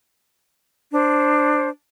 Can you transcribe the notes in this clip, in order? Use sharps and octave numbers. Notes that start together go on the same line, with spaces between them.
D4 C5